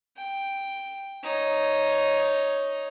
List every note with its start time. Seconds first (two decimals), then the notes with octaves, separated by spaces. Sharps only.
0.17 G5
1.23 D#4 C#5